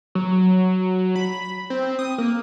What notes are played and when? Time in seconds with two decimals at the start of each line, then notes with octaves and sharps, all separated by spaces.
0.15 F#3
1.16 B5
1.70 C4
1.99 D#6
2.18 A#3